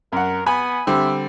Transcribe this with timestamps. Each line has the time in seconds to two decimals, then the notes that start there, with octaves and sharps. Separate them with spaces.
0.13 F#2 A#4 F#5
0.46 B3 G#5 B5
0.87 D3 G3 C4 E5